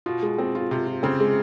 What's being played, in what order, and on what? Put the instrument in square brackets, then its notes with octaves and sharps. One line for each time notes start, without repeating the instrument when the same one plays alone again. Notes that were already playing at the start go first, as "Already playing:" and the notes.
[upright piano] B2 [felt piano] F4
[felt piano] G#3
C4
F4
[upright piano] C3 [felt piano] F4
[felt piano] F4
[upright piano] C#3 [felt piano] C4
[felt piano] G#3